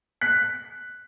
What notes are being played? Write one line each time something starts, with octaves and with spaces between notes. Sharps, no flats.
F#6 B6